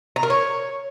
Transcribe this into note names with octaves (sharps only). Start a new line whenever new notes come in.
A#5
A#4
C#5